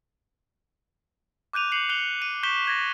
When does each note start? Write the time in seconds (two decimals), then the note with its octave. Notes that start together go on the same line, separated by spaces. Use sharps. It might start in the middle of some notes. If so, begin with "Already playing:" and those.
1.53 D6 F#6 G6 D#7 F7
1.72 G6 C7 C#7 D#7 F7 F#7
1.89 F#6 C#7 F7 G7
2.22 D#7
2.43 C#6 G6 B6 E7 G7
2.65 G6 G#6 A#6